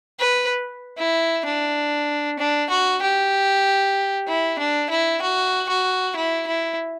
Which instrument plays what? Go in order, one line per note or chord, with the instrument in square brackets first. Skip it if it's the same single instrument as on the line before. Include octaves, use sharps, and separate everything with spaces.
[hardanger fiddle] B4
E4
D4
D4
F#4
G4
E4
D4
E4
F#4
F#4
E4
E4